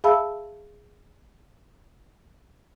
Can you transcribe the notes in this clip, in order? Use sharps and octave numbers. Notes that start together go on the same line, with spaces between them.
G#4 E5 F5 A5 B5 E6